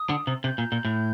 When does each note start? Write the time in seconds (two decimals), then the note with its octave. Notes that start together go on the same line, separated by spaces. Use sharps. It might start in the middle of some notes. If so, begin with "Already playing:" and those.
Already playing: D#6
0.09 D3
0.27 C3
0.44 C3 G6
0.58 A#2
0.72 A#2
0.85 A2